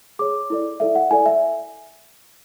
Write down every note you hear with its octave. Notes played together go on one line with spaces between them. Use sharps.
G#4 C#5 D6
E4 A4 D5
E4 A4 D5 E5
F#5
E4 A4 D5 G#5
E5